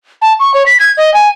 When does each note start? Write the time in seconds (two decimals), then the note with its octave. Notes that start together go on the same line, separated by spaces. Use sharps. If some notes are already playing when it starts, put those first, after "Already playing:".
0.22 A5
0.40 C#6
0.54 C#5
0.66 B6
0.80 G#6
0.97 D#5
1.14 G#5